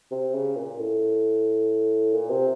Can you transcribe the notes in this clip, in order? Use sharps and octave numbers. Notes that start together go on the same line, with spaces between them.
C3
C#3
A#2
A2
A#2
C3